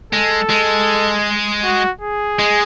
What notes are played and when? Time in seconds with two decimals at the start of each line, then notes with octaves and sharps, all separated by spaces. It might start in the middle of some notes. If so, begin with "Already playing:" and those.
0.12 G#3 A4
0.50 G#3
1.64 F#4
2.01 G#4
2.39 G#3